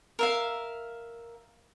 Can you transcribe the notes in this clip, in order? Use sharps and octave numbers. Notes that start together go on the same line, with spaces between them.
A#4 E5 F5